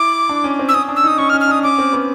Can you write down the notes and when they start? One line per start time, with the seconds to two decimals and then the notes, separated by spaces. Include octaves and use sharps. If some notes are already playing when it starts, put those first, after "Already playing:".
Already playing: E4 D6
0.29 D4
0.44 C#4
0.59 C4
0.69 E6
0.74 C#4 D#6
0.88 D4
0.96 E6
1.04 D#4 D#6
1.18 C#4 C#6
1.29 F6
1.33 C#4
1.41 F6
1.48 D4 D#6
1.63 C#4 D6
1.78 C4
1.93 B3